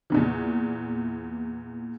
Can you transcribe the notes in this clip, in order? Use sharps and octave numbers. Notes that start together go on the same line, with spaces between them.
E2 A#2 E3